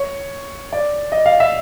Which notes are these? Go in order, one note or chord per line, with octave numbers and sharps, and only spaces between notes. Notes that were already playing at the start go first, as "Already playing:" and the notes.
Already playing: C#5
D5
D#5
F5
E5